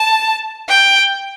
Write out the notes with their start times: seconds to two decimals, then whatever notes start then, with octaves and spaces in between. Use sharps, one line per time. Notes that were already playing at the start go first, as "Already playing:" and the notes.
Already playing: A5
0.69 G5